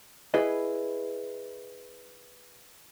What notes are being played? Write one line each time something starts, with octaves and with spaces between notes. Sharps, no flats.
E4 G#4 B4 D#5